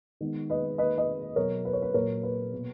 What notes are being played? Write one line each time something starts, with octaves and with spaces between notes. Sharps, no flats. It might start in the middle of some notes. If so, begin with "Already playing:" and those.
D#3 G#3 B3
B4 D#5
D#3 A#3 B4 D#5
B4 D#5
B2 F#3 B3 A#4 C#5
B4
C#5
B4
A#2 F#3 A#3 A#4 C#5
B4
B2 A#3